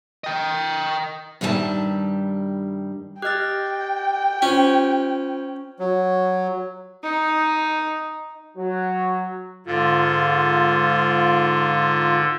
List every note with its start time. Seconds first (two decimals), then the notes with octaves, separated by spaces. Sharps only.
0.24 D#5 G5
1.41 G2 D#3 G3 B4 E5 A5
3.22 G4 D#5 G5 F6 F#6 A6
4.42 C#4 F4 C5
5.79 F#3
7.03 D#4
8.57 F#3
9.66 G#2 D3 F4